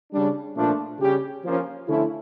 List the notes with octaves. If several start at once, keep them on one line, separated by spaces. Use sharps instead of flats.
C#3 G3 D4
A#2 F3 A3 D4
C#3 G3 C#4 G4
F3 A#3 C#4
D3 F3 A3 C#4 E4